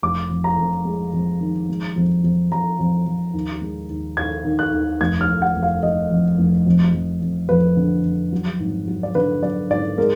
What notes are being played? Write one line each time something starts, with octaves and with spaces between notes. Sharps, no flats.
F1 D6
F2
A#5
F2
G#3
F2
D#3
G#3
F2
F2
F2 A#5
F2
F2
D#2
G#3
D#2
D#2 G#6
D#3
F#6
D#2
F1 G#6
F6
F1
F#5
F1
F5
F1 D#5
F2
F1
F2
F2
F2
F2 B4
D3
F2
F#3
G#1
F#3
D5
D3 B4
F#3 D5
G#1 D5
G#3 A#4